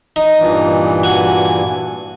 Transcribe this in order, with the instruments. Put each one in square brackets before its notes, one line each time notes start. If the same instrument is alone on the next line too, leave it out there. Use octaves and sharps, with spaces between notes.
[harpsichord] D#4
[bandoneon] G2 A#2 E3
[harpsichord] F#4 G#5